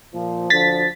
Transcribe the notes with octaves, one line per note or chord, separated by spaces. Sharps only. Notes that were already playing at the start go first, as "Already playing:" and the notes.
A#2 F3
D2 D3 F3 A6 B6